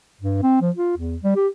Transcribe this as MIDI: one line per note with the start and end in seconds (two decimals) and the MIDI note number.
0.21 0.39 43
0.42 0.56 60
0.61 0.70 53
0.76 0.93 65
0.97 1.17 40
1.23 1.33 55
1.36 1.48 67